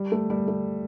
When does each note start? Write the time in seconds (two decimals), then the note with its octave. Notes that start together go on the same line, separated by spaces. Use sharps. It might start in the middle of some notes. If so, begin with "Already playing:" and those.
Already playing: G3
0.12 A3
0.30 G3
0.48 A3